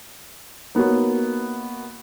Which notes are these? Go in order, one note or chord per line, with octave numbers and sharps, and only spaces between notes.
A#3 B3 D#4 F#4 C#5